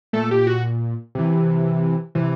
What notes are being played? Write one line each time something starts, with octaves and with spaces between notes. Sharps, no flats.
A#2 A3 A4
G4
F#4
C3 E3
C3 E3